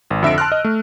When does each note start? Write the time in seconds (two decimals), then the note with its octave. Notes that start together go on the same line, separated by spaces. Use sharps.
0.10 G#1
0.23 F2 D3 E5 E6 A#6 D7
0.38 A5 C6 F6 F#6
0.52 D#5
0.64 A3